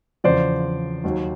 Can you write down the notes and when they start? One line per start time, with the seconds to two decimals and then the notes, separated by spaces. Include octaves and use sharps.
0.24 E2 C#3 F3 C5 D5
1.04 D#2 D#3 F#3